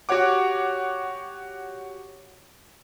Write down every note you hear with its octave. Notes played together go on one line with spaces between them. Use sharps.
F#4 G4 C#5 F#5 D6